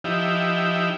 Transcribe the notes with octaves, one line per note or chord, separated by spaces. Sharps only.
F3 D#4 E4 G4